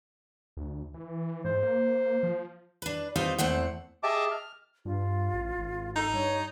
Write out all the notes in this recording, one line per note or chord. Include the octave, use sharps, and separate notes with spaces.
D2
E3
G#2 C5
A#3
F3
D4 B4
C4 D#4 F4 G4 B4 D#5
E2 A3 C4 F#5
G4 G#4 D#5 E5 A5 D6
F6
G2 F4
A1
G#1
D#4 A4
G2 C#5